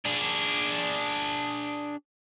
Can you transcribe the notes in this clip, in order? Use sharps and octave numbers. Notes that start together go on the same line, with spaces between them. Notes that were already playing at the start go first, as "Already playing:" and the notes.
D4 G#4